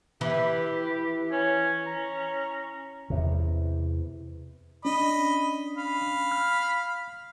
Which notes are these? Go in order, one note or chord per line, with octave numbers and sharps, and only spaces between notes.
E3 G4
C#4 G#5
A#5
E2 C3
C#4 D4 D#5 B5
F5 B5
F6